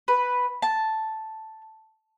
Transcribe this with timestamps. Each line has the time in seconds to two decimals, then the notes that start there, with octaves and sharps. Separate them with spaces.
0.08 B4
0.62 A5